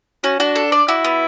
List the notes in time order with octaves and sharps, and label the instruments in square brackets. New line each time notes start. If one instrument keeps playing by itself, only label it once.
[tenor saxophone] C#4 [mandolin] F#4
[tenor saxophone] D4 [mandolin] F#4
[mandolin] A4
D5
[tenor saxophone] E4 [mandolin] F#4
[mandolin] B3